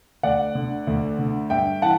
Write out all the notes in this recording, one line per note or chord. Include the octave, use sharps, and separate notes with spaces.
D2 D5 F#5
D3
D2
D3
G2 E5 G5
E3 F#5 A5